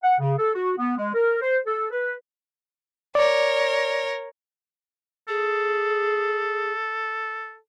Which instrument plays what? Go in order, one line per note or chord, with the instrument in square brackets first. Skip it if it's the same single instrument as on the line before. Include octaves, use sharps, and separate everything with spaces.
[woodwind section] F#5
C#3
A4
F#4
B3
G#3
A#4
C5
A4
B4
[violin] A#4 C#5 [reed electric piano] D5
[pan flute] G#4 [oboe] A4